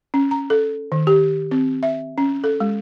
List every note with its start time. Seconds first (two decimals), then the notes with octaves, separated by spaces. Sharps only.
0.14 C#4
0.31 A#5
0.50 A4
0.92 D#3
1.07 G4
1.51 C4
1.83 E5
2.18 C#4
2.44 A4
2.60 G#3